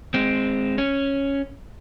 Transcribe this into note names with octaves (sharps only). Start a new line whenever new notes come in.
G#3 C4
C#4